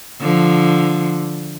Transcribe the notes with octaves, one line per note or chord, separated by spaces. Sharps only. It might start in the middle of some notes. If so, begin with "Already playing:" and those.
D3 F3